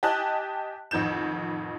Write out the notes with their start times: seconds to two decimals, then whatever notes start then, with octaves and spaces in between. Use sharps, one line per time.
0.03 G4 D#5 G#5 A5 F#6
0.91 A1 F2 D#3 G6 E7